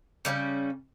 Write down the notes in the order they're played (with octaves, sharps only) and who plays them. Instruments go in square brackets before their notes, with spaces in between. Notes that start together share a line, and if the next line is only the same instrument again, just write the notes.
[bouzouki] C#3 G3 C4 C#4